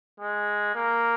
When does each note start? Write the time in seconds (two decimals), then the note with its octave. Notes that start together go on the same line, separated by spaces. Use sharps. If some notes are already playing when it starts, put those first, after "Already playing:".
0.20 G#3
0.75 A#3